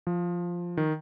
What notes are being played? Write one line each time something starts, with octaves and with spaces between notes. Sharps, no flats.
F3
D#3